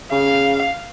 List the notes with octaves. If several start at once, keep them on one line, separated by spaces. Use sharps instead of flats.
C#3 F5